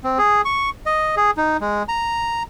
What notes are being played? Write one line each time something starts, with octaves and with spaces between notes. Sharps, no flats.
C4
G#4
C#6
D#5
G#4
D#4
G#3
A#5